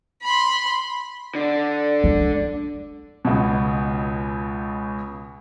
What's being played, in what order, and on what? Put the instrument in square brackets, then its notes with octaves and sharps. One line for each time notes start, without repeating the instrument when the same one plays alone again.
[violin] B5 C6
[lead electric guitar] D3 D4
[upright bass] G#3
[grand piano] C#2 B2